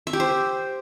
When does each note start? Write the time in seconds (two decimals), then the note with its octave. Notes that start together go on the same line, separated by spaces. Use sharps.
0.07 E5
0.13 G4
0.20 C5